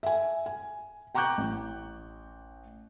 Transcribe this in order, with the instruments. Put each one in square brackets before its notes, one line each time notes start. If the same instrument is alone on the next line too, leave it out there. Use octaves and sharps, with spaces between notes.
[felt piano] E5 G#5
G#5
G5 A#5 C#6 D6 F#6 G6
A1